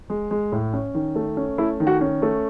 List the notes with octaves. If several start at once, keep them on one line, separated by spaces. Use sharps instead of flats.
G#3
G#3
A2
C#4
D#3
A3
C#4
A3 E4
D#3
F#4
C#4
A3